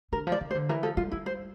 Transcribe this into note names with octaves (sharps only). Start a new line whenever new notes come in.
D3 A#4
F3
D5
E3
C5
D3
E3 A#4
F3 A4
G3 F4
G3 E4
C5